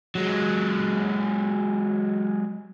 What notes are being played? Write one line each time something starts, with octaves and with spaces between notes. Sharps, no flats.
F#3 G#3